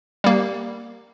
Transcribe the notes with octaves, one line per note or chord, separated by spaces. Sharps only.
G3 A#3